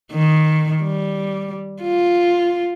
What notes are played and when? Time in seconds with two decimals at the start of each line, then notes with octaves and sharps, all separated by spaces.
0.12 D#3
0.83 G3
1.82 F4